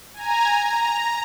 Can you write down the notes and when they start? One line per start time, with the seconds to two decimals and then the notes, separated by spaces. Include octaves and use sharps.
0.14 G#5 A#5
0.64 A#5